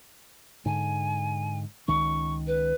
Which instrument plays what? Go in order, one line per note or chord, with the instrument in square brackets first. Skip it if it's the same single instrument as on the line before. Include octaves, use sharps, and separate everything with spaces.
[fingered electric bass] G#2 D3 [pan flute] G#5
[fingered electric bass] C#2 D#3 C#4 [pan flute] C#6
[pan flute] B4